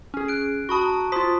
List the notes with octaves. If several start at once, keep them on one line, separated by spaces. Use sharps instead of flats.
C#4 G#4
F#6 D7
F#4 A5 B5 C#6 D#6
A#5
F4 C5 C6 D#6 B6